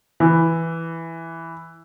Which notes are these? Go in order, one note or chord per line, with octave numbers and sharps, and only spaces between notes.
E3